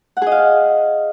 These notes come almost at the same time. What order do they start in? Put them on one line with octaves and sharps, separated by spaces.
F#5 G#4 D#5 F5